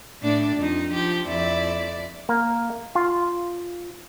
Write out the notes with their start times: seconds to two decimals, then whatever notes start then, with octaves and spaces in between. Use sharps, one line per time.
0.22 A2 D4 D5
0.57 F2 D#4
0.92 F3 G4
1.27 F2 E4 D5
2.29 A#3
2.95 F4